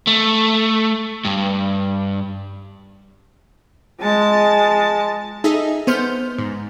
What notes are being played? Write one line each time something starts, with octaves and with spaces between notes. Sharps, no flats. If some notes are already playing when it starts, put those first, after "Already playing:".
A3
G2
G#3 A5
D#4 G#4 A4 D#5 E5
B3 C5 F6 G6
G#2